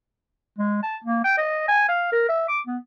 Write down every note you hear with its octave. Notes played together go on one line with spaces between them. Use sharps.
G#3
A5
A#3
G5
D#5
G#5
F5
A#4
E5
D6
B3